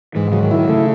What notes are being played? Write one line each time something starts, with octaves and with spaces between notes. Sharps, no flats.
G#2 E3
C#3 F#3
D#3
E4
D#3
C#3 A3